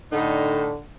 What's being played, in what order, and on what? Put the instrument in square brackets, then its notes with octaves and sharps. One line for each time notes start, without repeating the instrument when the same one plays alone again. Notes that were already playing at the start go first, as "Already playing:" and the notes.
[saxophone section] A2 D#4 [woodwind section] D3